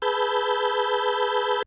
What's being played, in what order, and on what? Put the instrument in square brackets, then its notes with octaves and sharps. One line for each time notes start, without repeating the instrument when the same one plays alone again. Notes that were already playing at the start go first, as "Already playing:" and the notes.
[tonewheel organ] G#4 B4 A5 B5 E6 G6